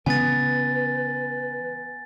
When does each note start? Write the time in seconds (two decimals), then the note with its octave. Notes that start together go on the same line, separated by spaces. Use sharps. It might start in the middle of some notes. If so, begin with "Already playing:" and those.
0.06 C#3 E3 G#3 B3 B4 G#5 A6